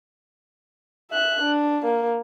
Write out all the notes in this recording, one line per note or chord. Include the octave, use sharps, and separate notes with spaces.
E5 F#6
D4
A#3